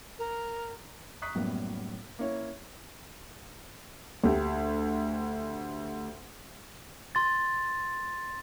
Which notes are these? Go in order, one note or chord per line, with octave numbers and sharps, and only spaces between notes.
A#4
A#5 C#6 D#6 F#6 B6 C7
F#2 A2 G3 A#3 B3
A#3 C#4 E4 C#5
D2 G4
C6 A6